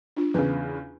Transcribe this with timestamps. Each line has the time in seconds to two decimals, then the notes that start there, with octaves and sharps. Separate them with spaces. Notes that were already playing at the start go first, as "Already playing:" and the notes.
0.17 D4 F4
0.34 E2 C#3 B4